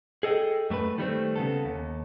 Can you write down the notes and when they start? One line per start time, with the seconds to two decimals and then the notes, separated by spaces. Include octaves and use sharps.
0.23 G#4 A4 D#5 G5
0.70 F#2 A3 A4 B4
0.98 D#3 G3 A3 C4
1.36 C#3 B3 A4
1.65 D#2